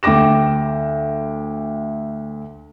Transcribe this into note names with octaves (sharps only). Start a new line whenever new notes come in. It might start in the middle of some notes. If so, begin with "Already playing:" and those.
D2 G5 D6 A#6 E7